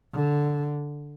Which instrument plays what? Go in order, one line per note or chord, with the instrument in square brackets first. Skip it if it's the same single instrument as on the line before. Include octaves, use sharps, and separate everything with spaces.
[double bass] D3